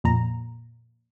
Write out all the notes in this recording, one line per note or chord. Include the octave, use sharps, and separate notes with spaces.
F2 A#2 A#5